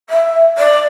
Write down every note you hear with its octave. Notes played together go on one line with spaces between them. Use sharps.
E5
D5